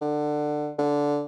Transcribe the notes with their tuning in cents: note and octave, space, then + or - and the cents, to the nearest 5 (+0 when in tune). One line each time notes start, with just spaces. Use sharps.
D3 +20
D3 -10